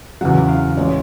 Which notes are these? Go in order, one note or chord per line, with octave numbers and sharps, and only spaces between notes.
E2 C#3 F#3 F#5
F5
A1 E3 G#3 C#5